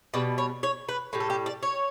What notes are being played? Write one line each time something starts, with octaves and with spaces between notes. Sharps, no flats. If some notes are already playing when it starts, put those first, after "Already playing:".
B2 G3 D5
C#5
C#5
B4
A2 G3
A4
G4
D5
C#5